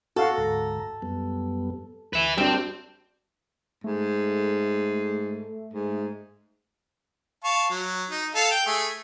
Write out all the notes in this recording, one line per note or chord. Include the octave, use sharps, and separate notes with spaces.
F#4 A4 F5 F#5
D2 G#2 A#5
F#2 G3 B3
D2 B4 E5
F#2 G3 C4 D4
G#2 A3
G#2
F5 A5 C#6
F#3
D#4
A4 F5
G5
A3 G#4